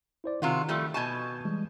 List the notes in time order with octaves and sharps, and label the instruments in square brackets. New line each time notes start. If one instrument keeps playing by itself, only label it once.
[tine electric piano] E4 C5 D5
[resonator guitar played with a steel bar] C3 F4 F#4 [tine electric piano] D#3
[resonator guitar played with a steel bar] F3 G3 A3
[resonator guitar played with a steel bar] B2 G#5 A5 [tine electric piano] C#6 G6 G#6
[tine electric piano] E3 G3 G#3